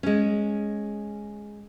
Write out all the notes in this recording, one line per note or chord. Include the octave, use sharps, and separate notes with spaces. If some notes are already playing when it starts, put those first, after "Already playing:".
G#3 C#4